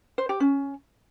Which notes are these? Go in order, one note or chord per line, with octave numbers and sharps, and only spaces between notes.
C5
G4
C#4